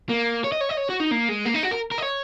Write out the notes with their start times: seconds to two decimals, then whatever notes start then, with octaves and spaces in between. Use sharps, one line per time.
0.09 A#3
0.44 C#5
0.52 D#5
0.61 C#5
0.70 D#5
0.78 C#5
0.90 F#4
1.00 D#4
1.12 A#3
1.29 G#3
1.46 A#3
1.55 D#4
1.63 F#4
1.71 A#4
1.92 A#4
1.98 D#5
2.03 C#5